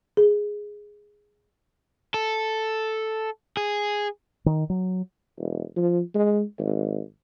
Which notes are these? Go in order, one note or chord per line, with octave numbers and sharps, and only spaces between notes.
G#4
A4
G#4
D#3
F#3
E1
F3
G#3
G#1